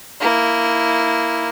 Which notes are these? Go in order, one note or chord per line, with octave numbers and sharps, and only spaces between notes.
A#3 E4